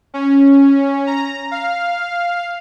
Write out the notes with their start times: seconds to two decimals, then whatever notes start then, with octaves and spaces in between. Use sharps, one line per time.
0.14 C#4
1.07 A#5
1.51 F5